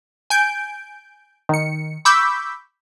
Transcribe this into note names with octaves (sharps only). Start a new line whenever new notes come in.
G#5 G6 D7
D#3 C#7
B5 C#6 D6 E6 G6 B6